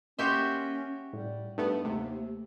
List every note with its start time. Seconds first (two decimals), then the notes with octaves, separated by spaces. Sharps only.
0.19 A#3 C#4 F#4 G4 E5 C6 G6
1.13 A2 G3
1.58 G2 A3 B3 D#4
1.85 D#2 C3 A3